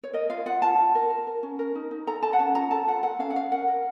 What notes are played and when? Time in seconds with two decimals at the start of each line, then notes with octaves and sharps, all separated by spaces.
0.04 C#5
0.13 A#4 D#5
0.30 F4 F5
0.46 F4 F#5
0.62 F4 A5
0.78 F4
0.95 A#4
1.10 A#4
1.27 A#4
1.43 C#4
1.59 A#4
1.75 D#4
1.91 D#4
2.07 A4 A#5
2.23 A4 A5
2.33 F#5
2.39 C#4 A5
2.55 F4 A#5
2.71 A4 A5
2.88 F4 F#5
3.03 A4 F#5
3.19 C#4 F5
3.30 F#5
3.36 C#4 F5
3.52 A#4 F#5
3.68 A#4